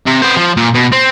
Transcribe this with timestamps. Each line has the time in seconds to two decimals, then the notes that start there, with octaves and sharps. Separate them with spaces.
0.06 C3
0.22 B3 C5
0.37 F3
0.57 A#2
0.74 B2
0.92 C4